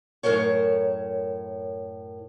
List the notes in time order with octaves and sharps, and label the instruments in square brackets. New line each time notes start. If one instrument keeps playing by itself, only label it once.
[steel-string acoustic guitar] F#2 A2 A3 A#4 C5 C#5